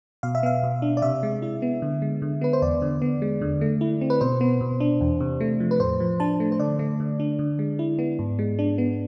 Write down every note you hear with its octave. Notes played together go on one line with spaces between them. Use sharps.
B2 F5
E5
B3 F5
B2
D4
D5
C3 E5
G#3
E4
B3
D3
G#3
D3
B3 B4
C5
E2 D5
D3
B3
G#3
D3
A3
E4
C4
B4
B2 C5
B3
B2
D4
E2
C3
A3
F3
B4
A2 C5
F3
D4 A5
A3
C5
D3 D5
A3
D3
D4
D3
G#3
E4
B3
G#2
G#3
D4
B3